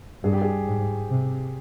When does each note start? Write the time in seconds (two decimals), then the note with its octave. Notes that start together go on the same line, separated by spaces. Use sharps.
0.24 G2 G#4
0.33 G4
0.42 G#4
0.67 G#2
1.10 C3